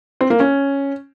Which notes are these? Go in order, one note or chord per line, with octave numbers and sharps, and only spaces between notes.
C4
A#3
C#4